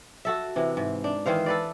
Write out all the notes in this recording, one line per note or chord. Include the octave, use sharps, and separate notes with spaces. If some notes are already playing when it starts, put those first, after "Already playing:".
F#4 A4 E5
C3 E3
G#2
D4
D#3 E3 C5 F5
A4 B4 D5